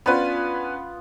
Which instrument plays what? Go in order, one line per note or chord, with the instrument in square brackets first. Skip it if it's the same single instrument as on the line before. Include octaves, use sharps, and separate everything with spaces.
[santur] B3 F4 [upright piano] C#4 D4 B4